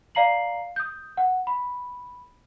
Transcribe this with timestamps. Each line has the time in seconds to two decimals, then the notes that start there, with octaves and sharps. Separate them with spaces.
0.15 D5 F5 A#5 C7 F#7
0.76 D#6 G6
1.17 F#5
1.47 B5